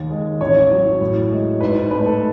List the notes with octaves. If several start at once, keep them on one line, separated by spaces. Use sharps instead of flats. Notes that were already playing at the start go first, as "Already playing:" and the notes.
Already playing: D#2 D#3
G#3
A1 C#5
F#3
A2
G#3
G#2 B4
A3 B4
A4